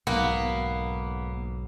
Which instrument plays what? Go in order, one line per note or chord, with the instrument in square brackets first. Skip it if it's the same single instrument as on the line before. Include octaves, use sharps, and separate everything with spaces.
[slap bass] B1 G#2 [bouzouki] A#3 B3